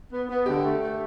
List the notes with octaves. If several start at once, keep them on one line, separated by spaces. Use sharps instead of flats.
B3
B3
D3 G4
A3
A3